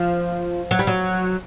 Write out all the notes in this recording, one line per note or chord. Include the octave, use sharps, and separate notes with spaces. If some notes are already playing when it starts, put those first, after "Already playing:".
Already playing: F3
F#3
G3
F#3